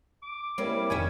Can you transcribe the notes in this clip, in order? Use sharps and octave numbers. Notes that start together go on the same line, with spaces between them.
D6
G3 A#3 C4 C#4 E4
F1 D#3 C#4 E5 G#5